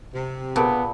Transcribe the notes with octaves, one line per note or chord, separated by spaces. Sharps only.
C3
A#2 B3 G#4 A5 B5